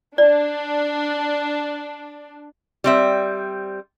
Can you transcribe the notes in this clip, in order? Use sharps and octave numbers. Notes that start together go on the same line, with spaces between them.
D4 D5
G3 C4 E5